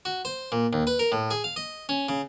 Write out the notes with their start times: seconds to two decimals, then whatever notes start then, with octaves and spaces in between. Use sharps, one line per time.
0.05 F#4
0.25 C5
0.52 A#2
0.73 D#2
0.87 B4
0.99 A#4
1.12 A2
1.31 G#4
1.44 F5
1.56 D#5
1.89 C#4
2.09 C#3